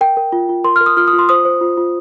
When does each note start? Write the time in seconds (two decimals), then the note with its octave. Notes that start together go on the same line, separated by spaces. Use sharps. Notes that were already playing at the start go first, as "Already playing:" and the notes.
0.01 A#4 G5
0.17 A#4
0.32 F4
0.49 F4
0.64 A#4 C6
0.76 F6
0.81 A#4
0.86 D#6
0.97 F4 F6
1.08 D#6
1.13 F4
1.19 C6
1.29 C5 D#6
1.45 C5
1.61 F4
1.77 F4